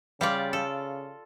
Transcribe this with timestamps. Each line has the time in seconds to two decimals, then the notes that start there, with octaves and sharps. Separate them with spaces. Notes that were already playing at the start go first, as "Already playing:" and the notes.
0.21 C#3 G3 F4 D5
0.53 A4